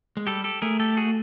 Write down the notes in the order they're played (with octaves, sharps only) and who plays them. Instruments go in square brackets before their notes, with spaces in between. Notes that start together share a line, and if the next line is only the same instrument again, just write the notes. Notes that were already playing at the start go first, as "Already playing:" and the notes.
[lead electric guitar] G#3
[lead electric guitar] G3 [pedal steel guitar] G4 A4
[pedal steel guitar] G4 A4
[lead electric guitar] A3 [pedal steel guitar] G#4 A#4
[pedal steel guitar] G4 A4
F#4 G#4